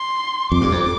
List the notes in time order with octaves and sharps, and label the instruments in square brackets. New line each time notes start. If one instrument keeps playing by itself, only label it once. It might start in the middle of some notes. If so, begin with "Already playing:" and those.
Already playing: [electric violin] C6
[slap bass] F2 [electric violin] D6
[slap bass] G2
F2